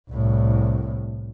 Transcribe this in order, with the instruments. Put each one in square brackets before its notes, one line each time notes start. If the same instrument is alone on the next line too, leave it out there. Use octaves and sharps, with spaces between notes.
[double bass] C2 A2